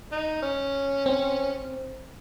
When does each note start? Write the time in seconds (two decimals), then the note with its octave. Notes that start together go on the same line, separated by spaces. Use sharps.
0.12 D#4
0.42 C#4
1.06 C4